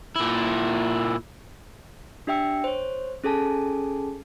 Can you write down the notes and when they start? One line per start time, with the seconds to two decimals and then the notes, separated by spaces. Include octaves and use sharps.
0.16 A#2 E4
2.27 D4 G4 E5 G5 E6 C#7
2.64 C5 C#5
3.24 C#4 G#4 A4 G#5 A5